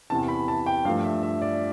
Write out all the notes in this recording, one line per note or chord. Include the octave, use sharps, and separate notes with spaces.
E2 C3 E3 A5
B5
A5
G5
G2 F3 A3 F5
E5
E5
D5